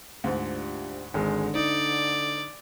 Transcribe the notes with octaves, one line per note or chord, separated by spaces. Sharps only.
D2 G#2 D4 F4 G4
G#1 D3 G#3
D#4 D5